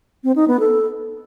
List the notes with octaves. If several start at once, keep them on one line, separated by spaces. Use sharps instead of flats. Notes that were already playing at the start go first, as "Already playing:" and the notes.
C4
D#4
B3
A4